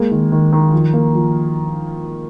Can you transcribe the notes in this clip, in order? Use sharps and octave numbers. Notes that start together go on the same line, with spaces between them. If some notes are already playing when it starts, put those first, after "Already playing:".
Already playing: G#3 A#3
D#3
D#3
D#3
F3
A#3
F3